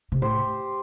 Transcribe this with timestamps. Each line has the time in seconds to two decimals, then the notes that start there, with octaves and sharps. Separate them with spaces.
0.12 C3
0.22 A2 G4 C5